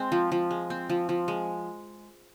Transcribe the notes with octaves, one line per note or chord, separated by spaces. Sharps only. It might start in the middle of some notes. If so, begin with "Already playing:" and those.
Already playing: G#3 C4
F3
F3
G#3
C4
F3
F3
G#3